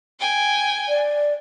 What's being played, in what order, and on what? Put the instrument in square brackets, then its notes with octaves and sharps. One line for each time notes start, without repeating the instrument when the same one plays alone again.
[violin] G5 G#5
[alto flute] D5